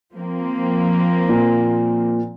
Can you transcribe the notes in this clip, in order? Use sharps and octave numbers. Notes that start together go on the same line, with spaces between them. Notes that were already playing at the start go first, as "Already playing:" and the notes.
F3 A#3 C4
A#2